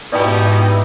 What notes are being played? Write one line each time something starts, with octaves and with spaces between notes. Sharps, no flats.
G#2 B2 D#4 E4 G4 D5 G5